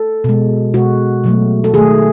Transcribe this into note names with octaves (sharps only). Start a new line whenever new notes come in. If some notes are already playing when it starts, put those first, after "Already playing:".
Already playing: A4
B2 G#3
B2 G#3 F#4
B2 F#3 A3
A4
D#3 A3 G#4